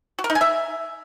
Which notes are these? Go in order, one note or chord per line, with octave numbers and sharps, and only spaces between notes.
F#4
A#4
D#4
G#5
E5